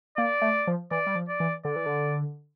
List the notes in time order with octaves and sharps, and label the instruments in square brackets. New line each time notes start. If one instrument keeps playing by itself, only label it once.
[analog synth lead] A#3 [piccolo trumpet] D5
[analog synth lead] A3
F3
[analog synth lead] E3 [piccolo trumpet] D5
[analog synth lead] G3
F3
[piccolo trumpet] D5
[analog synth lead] E3
[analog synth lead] D3 [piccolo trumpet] D5
[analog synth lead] E3
D3